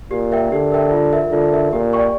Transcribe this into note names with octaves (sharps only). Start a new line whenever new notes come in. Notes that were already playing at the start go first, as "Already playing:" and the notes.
A#2 G4
A#4 E5 G5
D3 G4
A#4 E5 G5
F4
A#4 E5
D3 F4
A#4 E5
A#2 G4
D5 G5 C#6